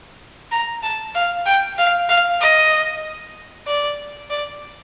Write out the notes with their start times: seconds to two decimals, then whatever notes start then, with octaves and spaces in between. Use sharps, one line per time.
0.51 A#5
0.83 A5
1.14 F5
1.46 G5
1.78 F5
2.09 F5
2.41 D#5
3.67 D5
4.30 D5